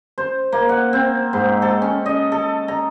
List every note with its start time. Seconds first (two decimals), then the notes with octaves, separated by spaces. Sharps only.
0.18 C5
0.52 A#3
0.69 F#5
0.93 C4
1.33 G#2
1.62 A4
1.82 C#4
2.06 D#5
2.32 A4
2.68 A#5